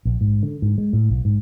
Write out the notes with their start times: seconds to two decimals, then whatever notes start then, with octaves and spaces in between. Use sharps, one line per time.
0.05 A#1
0.21 G#2
0.43 D3
0.62 G#2
0.78 G#3
0.93 A2
1.10 B1
1.25 G#2